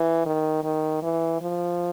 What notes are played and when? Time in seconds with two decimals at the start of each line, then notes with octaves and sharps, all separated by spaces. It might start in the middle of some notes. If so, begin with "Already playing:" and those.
Already playing: E3
0.26 D#3
0.63 D#3
1.03 E3
1.41 F3